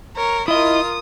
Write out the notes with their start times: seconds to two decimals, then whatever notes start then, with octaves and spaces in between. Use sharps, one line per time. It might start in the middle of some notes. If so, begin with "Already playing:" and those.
0.16 A#4 C#5
0.48 E4 F4 A#4 D#5 D#6